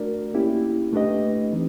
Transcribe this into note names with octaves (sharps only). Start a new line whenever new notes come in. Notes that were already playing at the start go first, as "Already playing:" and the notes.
Already playing: A3 D4 F#4 A#4 D5
A#3 C#4 E4 G4
A3 D4 G4 B4 D#5
E3 C4 D#4